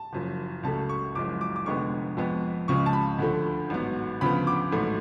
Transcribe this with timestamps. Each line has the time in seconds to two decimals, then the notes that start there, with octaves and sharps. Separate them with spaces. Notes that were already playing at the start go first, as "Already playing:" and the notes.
Already playing: A5
0.13 F#1 F#2 F3
0.63 C#2 C#3 F#3 A3 A5
0.89 C#6
1.15 F#1 F#2 F3 G#3 D6
1.41 D6
1.56 D6
1.66 F1 F2 D3 G#3 B3 C#6
2.17 F2 F3 G#3 B3
2.68 C#2 C#3 F3 G#3 C#6
2.86 A5
2.93 B5
3.19 D2 D3 F3 A3
3.70 A1 G#2 F#3 B3
4.21 D2 C#3 F3 B3 B5
4.47 D6
4.72 A1 G#2 F#3 A3